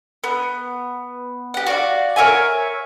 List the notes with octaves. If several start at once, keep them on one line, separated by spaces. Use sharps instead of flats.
B3
G4 F#5
F#4 D5 F5
A#4 C#5 E5 G#5